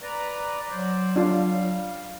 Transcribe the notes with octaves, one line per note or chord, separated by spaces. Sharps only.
B4 D5 A#5
F#3 C5 D5
G3 D4 F4 F5